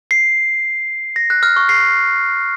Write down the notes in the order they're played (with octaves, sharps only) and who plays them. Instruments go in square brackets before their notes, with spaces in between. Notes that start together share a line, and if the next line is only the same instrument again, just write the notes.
[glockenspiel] C7
A#6
F#6
F6
C#6
C7